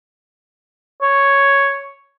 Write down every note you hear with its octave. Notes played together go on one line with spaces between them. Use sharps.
C#5